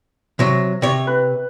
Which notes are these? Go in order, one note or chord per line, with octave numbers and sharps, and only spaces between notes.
C3 F#3
C3 C#5
B4